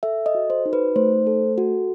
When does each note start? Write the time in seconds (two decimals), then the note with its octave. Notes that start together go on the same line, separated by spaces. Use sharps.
0.03 A4 E5
0.26 D#5
0.35 F#4
0.50 C5
0.66 D#4
0.73 B4
0.96 A3 C5
1.27 A4
1.58 F#4